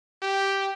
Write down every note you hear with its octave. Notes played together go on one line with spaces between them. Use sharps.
G4